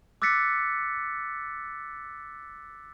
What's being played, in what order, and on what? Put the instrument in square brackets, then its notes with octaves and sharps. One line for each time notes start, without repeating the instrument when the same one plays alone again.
[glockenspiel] D6 E6 F#6 A6 B6 C#7